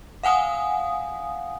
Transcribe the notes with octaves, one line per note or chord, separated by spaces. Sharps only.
F5 F#5 G#5 D#6